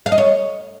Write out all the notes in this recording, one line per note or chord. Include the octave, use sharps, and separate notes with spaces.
F5
D#5
C#5